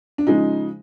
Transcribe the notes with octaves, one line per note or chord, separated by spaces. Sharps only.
D4
C#3 F3 G#3 D#4